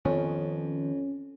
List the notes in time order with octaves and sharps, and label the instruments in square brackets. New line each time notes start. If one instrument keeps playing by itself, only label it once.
[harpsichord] F2 [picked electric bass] D#3 F3 B3 [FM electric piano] C#4